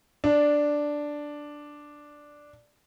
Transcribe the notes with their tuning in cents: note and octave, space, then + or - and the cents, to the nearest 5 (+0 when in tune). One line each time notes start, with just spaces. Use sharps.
D4 +0